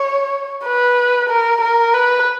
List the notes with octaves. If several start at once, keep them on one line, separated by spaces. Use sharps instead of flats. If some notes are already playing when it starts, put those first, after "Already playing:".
Already playing: C#5
B4
A#4
A#4
B4